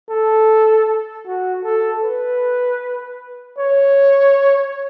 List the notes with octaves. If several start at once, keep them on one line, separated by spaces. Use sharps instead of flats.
A4
F#4
A4
B4
C#5